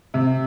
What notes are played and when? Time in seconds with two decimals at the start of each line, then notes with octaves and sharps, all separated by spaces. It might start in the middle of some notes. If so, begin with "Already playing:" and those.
0.14 C3